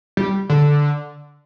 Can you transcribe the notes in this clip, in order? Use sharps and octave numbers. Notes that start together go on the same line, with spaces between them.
G3
D3